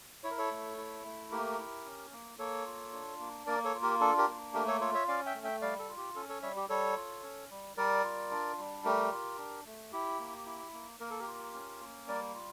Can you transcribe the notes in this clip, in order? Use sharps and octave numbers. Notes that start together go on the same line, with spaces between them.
E4 C#5
A#4
A4 C#5
A3
E4
A3
A#3 G4 A#4
E4
C#4
A#3
A#3 A4 C#5
F4
D4
A#3
A#3 A#4 D5
A4 C#5
F4
G4 A#4
D4 A4
G4 A#4
A#3
A3 G4 A#4
A4 C#5
F4 A4 C#5
C#5 E5
C#4 D5 F5
E5 G5
A3
E5 G5
G3 D5 F5
A4
F4
G4
C#4 A4
A4 C#5
G3 C#5 E5
G4
G3 A4 C#5
F4
C#4
G3
G3 A#4 D5
F4
D4
G3
A3 G4 A#4
F4
D4
A3
E4 G4
A#3
E4
A#3
A#3 A#4
A4
G4 A#4
F4
C#4
A#3
G3 A#4 D5
F4